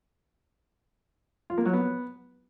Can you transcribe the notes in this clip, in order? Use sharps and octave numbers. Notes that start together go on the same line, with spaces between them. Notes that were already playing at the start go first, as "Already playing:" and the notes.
F4
A#3
F#3
B3